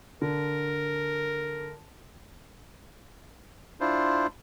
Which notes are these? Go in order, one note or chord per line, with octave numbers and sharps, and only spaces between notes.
D3 A#4
D4 E4 F4 C5